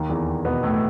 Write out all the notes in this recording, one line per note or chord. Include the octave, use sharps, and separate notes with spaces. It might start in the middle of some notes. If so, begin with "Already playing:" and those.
Already playing: D#2 D#3
E2 E3
B2 B3
A2 A3